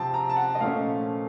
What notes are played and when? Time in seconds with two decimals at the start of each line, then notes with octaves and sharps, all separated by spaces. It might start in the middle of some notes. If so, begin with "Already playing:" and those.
Already playing: C3 F3 C4 A5
0.14 A#5
0.30 A5
0.36 F#5
0.55 D#5
0.60 A#2 F3 A3 C#4 F5